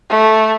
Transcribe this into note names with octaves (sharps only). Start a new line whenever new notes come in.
A3